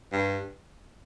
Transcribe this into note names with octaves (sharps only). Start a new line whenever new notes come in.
G2